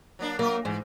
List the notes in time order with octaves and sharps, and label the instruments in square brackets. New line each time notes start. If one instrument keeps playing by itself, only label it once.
[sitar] F#3 A#3 D4
[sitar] F#3 A#4 E5 [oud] A#3
[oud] G#2 [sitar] E3